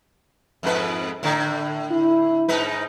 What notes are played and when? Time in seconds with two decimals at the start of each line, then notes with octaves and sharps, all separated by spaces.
0.63 F2 G#2 B4
1.23 A2 D3
1.91 E4
2.48 G#2 D#4 B4